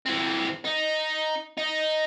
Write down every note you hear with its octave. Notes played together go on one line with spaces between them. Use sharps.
E3 C4
D#4
D#4